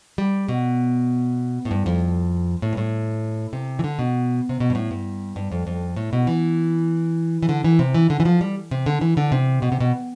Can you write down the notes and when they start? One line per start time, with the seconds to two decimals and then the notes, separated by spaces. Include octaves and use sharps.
0.18 G3
0.48 B2
1.65 A2
1.71 G2
1.86 F2
2.62 A2
2.73 G2
2.77 A2
3.53 C3
3.79 E3
3.84 D3
3.99 B2
4.49 C3
4.60 B2
4.70 G2
4.75 A2
4.91 G2
5.36 G2
5.52 F2
5.67 F2
5.96 A2
6.13 B2
6.27 E3
7.43 E3
7.49 D3
7.64 E3
7.79 C3
7.94 E3
8.10 D3
8.20 E3
8.25 F3
8.41 G3
8.71 C3
8.86 D3
9.01 E3
9.17 D3
9.32 C3
9.62 B2
9.72 C3
9.80 B2